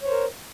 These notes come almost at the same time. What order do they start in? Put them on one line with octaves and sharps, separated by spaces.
C#5 C5 A#4